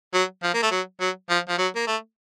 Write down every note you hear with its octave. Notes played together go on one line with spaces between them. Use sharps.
F#3
F3
A#3
A3
F#3
F#3
F3
F3
F#3
A#3
A3